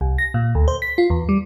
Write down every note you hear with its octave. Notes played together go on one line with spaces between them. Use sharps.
C2
A#6
A#2
D2
C5
B6
F4
E2
G3